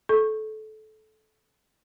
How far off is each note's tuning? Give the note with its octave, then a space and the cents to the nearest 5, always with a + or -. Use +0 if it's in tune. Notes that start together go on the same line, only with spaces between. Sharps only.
A4 -20 C#6 -15